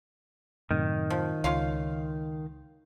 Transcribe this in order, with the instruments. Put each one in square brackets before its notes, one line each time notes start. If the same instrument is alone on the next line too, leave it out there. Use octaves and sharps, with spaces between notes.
[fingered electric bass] F#2 A2 C3 [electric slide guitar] D#3
[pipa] F3
[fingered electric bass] C#2 [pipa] C#4 F4 F5